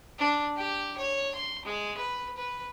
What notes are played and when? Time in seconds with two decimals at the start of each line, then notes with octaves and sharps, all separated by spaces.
0.18 D4
0.56 G4
0.97 C#5
1.35 C6
1.65 G#3
1.97 B4
2.37 B4